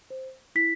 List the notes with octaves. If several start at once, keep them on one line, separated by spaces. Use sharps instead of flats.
C5
E4 B6